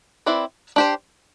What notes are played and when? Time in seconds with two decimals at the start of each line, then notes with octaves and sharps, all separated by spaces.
0.26 C4 E4 B4 D5
0.76 D4 G4 C5